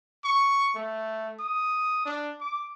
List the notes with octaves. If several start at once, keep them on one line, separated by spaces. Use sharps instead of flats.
C#6
A3
D#6
D4
D6